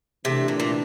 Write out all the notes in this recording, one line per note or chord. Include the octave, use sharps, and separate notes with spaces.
C3 E3 A3 D4 G4
A#2
A#2